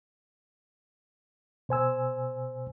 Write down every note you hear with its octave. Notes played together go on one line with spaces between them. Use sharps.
B2 C5 G#5 E6